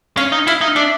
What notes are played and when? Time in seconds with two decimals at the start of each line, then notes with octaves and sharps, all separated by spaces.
0.17 C#4 F5
0.32 D#4
0.47 E4 F5
0.61 D#4
0.76 D4 E5